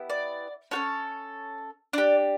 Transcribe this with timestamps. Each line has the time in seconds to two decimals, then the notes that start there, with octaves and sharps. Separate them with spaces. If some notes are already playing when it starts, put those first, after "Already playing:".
Already playing: B3 E4 G4
0.10 D5
0.71 C#4 F#4 A4 C#5
1.93 D4 G4 D5